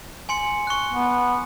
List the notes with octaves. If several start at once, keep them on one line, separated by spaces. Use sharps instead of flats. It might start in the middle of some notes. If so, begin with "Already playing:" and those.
G#5 C6 C#7
C#6 F#6
B3